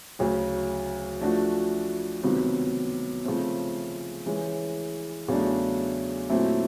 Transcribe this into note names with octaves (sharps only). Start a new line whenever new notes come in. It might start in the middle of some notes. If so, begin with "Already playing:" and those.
D2 C#3 F#3
F3 A3 D4 F#4
C#2 C3 D#3 F#3 B3
C#3 F3 A3 C4
E3 G#3 C#4
E2 C#3 F#3 A3 D4
A#2 F#3 A3 C4 E4